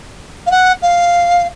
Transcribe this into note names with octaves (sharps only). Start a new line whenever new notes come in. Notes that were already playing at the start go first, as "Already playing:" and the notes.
F5
F#5
F5